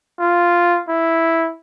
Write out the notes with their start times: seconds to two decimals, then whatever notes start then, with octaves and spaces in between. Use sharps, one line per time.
0.19 F4
0.88 E4